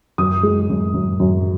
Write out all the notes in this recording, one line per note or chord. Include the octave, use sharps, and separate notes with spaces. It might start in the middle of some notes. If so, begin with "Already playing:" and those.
F#2 D#6
G#3
F#2
F#2
F#2